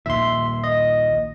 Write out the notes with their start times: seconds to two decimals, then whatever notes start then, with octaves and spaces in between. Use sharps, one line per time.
0.06 A#1 D#2 A#2 E5 C6
0.64 D#5